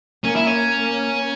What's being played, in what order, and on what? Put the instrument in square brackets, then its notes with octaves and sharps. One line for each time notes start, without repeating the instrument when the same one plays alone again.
[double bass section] A#3 [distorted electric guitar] C#4
[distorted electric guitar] E4
C#4
[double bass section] A#3